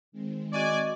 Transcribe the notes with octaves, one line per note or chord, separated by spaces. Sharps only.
D#3 G#3 C4
F#4 D5 D#5 G#5 C#6